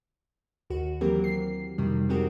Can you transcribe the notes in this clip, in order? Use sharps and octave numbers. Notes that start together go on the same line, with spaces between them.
D#2 F#4
E3 F#3 A#3 C4 G4 A#4
C7
F2 C3 D#3 G3
D#3 G#3 C4 F#4 G4 A#4